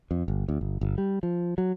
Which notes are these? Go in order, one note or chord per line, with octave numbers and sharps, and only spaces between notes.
F2
G1
D2
G1
G1
G3
F3
F#3